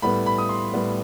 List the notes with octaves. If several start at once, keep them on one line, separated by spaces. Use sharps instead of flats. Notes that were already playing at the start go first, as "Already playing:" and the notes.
A2 G3 B3 B5
B5
D#6
C6
A2 G3 B3